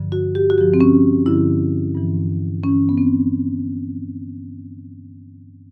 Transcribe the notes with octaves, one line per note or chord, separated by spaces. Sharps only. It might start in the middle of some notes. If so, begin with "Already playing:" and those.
Already playing: G2 D3 F3
F#4
G4
F#4
G2 D3 F3 G4
C4
C#4
G2 D3 F3 E4
G2 E3
G2 E3 C#4
B3
C4